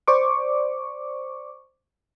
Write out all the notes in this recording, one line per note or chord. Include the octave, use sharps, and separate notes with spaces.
C5 D5 C#6 D6